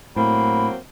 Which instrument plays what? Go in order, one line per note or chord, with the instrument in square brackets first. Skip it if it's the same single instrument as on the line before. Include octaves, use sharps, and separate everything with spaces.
[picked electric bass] A2 [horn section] F#3 A#3 C4 [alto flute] B5